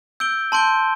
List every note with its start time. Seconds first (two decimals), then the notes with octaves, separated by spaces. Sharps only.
0.20 E6 G6 D7 G7
0.52 A5 C6 G6 D7 G7